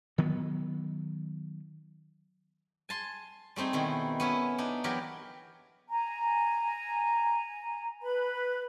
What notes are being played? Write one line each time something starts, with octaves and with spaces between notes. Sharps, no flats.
D#3 F#3 B3
G#5 A5 C6
G3 A3 C4 D#4 G#4
B2 D#3 E4
B3 C#4 E4
D4 D#4
E3 F#3 G4 A#4 E5
G#5 A#5
B4 B5